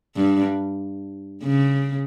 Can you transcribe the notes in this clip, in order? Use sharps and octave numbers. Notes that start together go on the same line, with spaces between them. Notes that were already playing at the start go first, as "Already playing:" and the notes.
G2
C#3